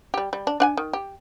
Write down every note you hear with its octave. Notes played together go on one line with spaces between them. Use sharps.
G3 G4
G3
D4
D4 F#5 G#5
D#3
G4